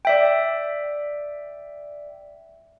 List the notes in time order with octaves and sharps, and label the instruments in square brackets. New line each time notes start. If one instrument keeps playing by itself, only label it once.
[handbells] D5 E5 G5